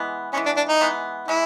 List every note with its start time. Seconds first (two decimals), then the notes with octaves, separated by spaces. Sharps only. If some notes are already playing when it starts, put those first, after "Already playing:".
Already playing: E3 G#3 B3
0.33 E3 G#3 B3 C#4
0.46 D4
0.56 D4
0.68 D#4
0.81 E3 G#3 B3
1.28 E3 G#3 E4